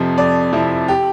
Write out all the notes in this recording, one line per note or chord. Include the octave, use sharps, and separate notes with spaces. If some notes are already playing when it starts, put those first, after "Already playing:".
Already playing: F2 C3 F3
F2 D5
C3 F3 E4
G4